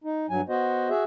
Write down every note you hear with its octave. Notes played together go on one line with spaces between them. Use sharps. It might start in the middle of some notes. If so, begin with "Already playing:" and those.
D#4
G2 F#3 G#5
B3 F#4 C5 D#5
F#4 G#4 E5